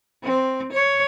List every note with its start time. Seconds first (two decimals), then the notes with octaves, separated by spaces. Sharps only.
0.24 C4
0.73 C#5